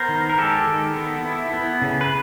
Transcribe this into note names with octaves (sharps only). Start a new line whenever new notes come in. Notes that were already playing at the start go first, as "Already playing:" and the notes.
Already playing: B3 A#4 C5
D#3
A#4
G#3 G4 A4
D#3
B3
E4
B3
C#3
B4